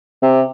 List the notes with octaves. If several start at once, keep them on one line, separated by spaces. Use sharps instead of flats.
C3